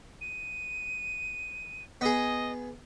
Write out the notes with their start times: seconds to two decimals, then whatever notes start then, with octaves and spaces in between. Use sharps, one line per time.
0.21 D#7
2.01 B3 G#4 D#5